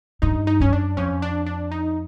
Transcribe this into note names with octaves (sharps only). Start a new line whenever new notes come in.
G2 D#4
D#4
F#2 C#4
D4
F2 C#4
D4
D4
D#4